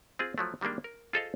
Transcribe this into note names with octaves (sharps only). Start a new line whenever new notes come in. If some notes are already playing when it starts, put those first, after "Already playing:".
C4 F4 G#4
F3 F#3 A3
D#3 G3 G#3 A#3 D4
A#4
F4 G#4 A4 C5 D#5 F5